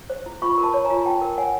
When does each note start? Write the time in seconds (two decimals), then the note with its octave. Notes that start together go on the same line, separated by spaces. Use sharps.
0.10 C5
0.26 E4
0.42 F4 B5 C#6
0.58 A#4
0.63 A5 B5
0.74 C#5
0.85 G#5 A#5
0.90 F4
1.06 F4 G5 A5
1.21 A#4
1.38 C#5 F#5 G#5